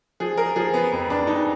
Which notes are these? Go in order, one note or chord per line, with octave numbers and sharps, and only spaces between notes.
F3 G#4
A#4
F3 G#4
B3
F2 B3
D4
F2 D#4